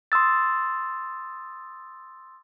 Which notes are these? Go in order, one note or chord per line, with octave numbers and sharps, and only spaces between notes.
C6 D#6 E6 A6